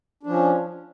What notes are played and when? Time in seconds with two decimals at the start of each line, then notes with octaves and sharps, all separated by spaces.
0.23 D4
0.26 F3
0.30 C#4